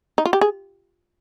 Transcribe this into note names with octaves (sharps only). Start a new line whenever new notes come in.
D#4
F4
G4
G#4